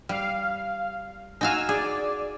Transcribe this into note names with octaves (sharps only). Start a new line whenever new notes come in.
G3 F5
D#4 F#4 F5 G#5 E6
G#4 D5